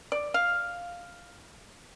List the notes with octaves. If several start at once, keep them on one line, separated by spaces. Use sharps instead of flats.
D5
F5